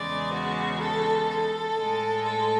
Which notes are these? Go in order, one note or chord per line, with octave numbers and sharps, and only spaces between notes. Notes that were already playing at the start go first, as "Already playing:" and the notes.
Already playing: E2 C#3 G#3 D5
F#4
A4
A4
A2 G#3
A4